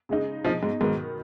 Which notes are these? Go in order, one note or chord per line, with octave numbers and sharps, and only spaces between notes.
C#3 G#3 D#4
B2 F3 G#3 D#4
G#2
G#2 D#3 F#3 B3